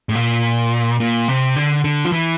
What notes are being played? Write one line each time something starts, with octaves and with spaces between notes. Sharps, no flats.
A2
A#2
A#2
C3
D3
D3
F3
E3